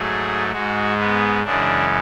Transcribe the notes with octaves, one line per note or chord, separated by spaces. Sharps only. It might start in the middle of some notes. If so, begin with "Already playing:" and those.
Already playing: G#2 F#3 A3 G#4
G#2 G#3 F#4
B3
F#2 C#3 E3 G#3 D4